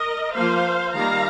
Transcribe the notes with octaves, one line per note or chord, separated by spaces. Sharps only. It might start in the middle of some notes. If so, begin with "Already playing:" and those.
Already playing: A#4 D#5
F3 A#3 C5 F5
D#3 G3 A#3 F5 A#5